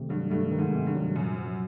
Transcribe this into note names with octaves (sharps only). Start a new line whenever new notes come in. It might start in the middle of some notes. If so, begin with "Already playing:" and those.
Already playing: C3 D#3 A3
G2 F#3
G2 A3
D#3
G#2
C3
G2
F#3
F#2 A#2
F3